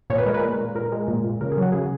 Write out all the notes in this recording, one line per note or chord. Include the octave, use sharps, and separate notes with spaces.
A#2 C#5
B4
G#3 A#4
B4
A#2
A#2
A#2 A#4
G#3
A#2
A#2
C#3 A#4
G#4
F#3 F#4
C#3 G#4